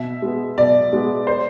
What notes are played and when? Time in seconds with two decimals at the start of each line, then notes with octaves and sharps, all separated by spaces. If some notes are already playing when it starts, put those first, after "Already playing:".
Already playing: B2 E5
0.22 G#3 B3
0.58 B2 D5
0.93 G#3 B3
1.27 C5